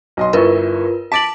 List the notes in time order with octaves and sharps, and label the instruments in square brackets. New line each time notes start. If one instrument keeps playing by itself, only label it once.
[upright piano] B1 D#5 C6
[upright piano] G1 E4 C#6 [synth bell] F4 A#4 B4
[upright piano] A5 D6 A6 [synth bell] B6 D7 F#7